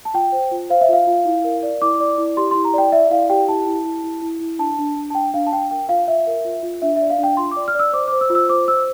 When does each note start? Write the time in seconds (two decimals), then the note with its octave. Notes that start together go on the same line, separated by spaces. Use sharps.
0.05 A5
0.14 F4 G5
0.32 C5
0.51 F4
0.69 C5 F5
0.81 E5
0.89 F4 F5
1.07 F4
1.25 E4
1.44 A#4
1.63 D5
1.82 E4 D6
2.00 D5
2.18 E4
2.37 G4 C6
2.51 E4 C6
2.65 A#5
2.73 D5 G5
2.92 D5 E5
3.10 E4 F5
3.29 G4 G5
3.48 E4 A5
3.66 E4
3.85 E4
4.04 E4
4.22 E4
4.40 E4
4.59 D4 A5
4.78 D4
4.96 D4
5.10 A5
5.15 D4 G5
5.34 D4 F5
5.47 A5
5.52 D4 G5
5.71 A#4 G5
5.89 F4 F5
6.08 F4 E5
6.27 A#4
6.45 F4
6.63 F4
6.82 D4 E5
6.96 D5 E5
7.10 F5
7.18 D4
7.23 G5
7.37 F4 C6
7.51 D6
7.56 D5
7.68 F6
7.75 D5 E6
7.93 C5 D6
8.08 C5 D6
8.21 E6
8.30 F4
8.35 E6
8.49 C5 D6
8.68 C5 E6